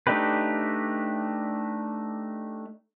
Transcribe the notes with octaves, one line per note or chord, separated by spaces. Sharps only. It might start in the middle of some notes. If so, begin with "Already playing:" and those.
A3 D4 D#4 G4 B4